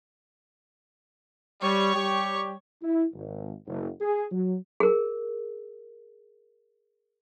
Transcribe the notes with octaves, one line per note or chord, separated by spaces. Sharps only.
G3 C#5 C#6
G3 G4
E4
G#1
F#1
G#4
F#3
G#4 A#4